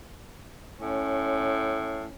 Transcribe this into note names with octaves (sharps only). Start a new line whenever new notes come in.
A2 C#4